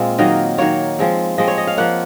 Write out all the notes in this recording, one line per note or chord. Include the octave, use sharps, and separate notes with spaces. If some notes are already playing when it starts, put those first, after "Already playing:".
Already playing: A#2 G#3 C4 F4
D#3 F#3 A#3 D#5
D#3 F#3 A#3 C#5
F3 G#3 C4
F3 G#3 C4 D#5
C#5
D#5
F5
F3 A#3 F#5